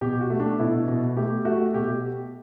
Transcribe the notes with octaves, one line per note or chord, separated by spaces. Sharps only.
B2 G4
F#4
A3
D4
B2 E4
B2
A3 G4
A3 F#4
B2 G4